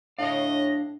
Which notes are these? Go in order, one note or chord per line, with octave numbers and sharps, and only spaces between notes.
A2 D4 C#5 D#5 F5